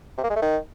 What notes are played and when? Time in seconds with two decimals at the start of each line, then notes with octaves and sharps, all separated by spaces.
0.18 C3
0.24 A#3
0.30 G#3
0.36 A3
0.42 D#3